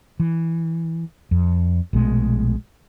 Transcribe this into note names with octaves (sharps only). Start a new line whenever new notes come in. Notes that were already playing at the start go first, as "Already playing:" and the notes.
E3
F2
A#1 B2 G#3 A3